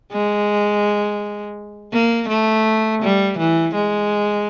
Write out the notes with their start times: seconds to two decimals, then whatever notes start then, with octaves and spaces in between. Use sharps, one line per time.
0.12 G#3
1.93 A#3
2.29 A3
3.02 G3
3.38 E3
3.75 G#3